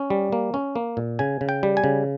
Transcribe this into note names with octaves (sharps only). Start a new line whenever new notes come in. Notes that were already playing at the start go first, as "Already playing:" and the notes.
Already playing: C#4
G3
A#3
C#4
A#3
A#2
C#3 G#5
C#3
G5
G3
G#5
C#3